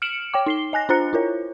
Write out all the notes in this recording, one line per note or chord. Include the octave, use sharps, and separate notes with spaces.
F6 C#7 D7 E7 F#7
C#5 G5 D6
D#4 C7 G7
D#5 G#5 F#6 A#6
D4 F4 C5 A#5 F#6 C#7
E4 F4 A#4 C#5